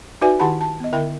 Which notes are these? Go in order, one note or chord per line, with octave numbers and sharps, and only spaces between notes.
D#4 F#4 B4 D5 E5 G#5
D#3 E4 G4 F#5 A5 B5
A5
B3 D#5
D3 E4 A#4 E5 G5